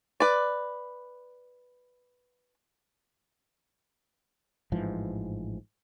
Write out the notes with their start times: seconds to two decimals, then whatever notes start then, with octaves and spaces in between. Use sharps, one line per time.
0.20 B4 D5
4.72 A1 G#2 E3 F3